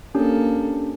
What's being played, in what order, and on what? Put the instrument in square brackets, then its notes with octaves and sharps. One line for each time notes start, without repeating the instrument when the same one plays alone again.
[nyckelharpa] A#3 A4 [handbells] C#4 D4 G4